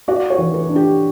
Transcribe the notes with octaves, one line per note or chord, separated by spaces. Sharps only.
F#4 D5
C#5
E3
B4
D4
G4